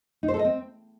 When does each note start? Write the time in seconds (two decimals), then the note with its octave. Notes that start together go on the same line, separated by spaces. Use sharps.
0.23 D#4
0.28 C5
0.34 A4
0.39 D#5
0.45 C4